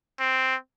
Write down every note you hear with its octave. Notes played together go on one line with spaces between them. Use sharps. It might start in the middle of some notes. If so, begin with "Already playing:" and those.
C4